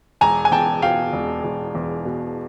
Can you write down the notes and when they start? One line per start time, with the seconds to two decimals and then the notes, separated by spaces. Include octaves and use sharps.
0.21 E1 G#5 A#5
0.45 G#5
0.52 E2 G5 A5
0.82 B2 F5 G5
1.13 E1
1.44 E1
1.75 E2
2.05 B2